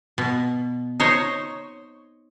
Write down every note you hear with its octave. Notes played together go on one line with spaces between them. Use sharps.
B2
D#4 C5 C#5